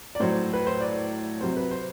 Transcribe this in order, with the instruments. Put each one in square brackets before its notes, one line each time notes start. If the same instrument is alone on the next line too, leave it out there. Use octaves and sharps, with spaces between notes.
[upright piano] D5
A2 F#3 C5
B4
C5
D5
C3 F#3 C5
B4
C5